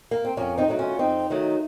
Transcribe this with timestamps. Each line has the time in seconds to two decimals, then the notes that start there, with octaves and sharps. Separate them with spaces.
0.11 A#3
0.25 C4
0.37 F2 A#3 C#4
0.58 C4 D#4
0.68 D#3 F#3 A3 D#4
0.79 C#4 F4
0.99 F2 C4 D#4
1.30 D#3 F#3 A3